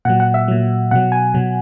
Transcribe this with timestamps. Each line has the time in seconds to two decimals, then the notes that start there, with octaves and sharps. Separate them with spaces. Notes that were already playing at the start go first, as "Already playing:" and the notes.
0.05 A#2 F#3 F#5
0.20 F#5
0.34 E5
0.48 A#2 F#3
0.91 B2 F#3 F#5
1.12 G#5
1.34 B2 F#3